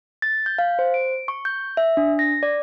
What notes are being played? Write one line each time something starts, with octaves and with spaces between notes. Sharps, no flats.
A6
G6
F5
C5
D7
C#6
G6
E5
D4
A#6
D5